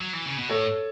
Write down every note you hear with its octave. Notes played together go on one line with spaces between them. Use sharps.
F#3
E3
C#3
B2
A2 A4 C#5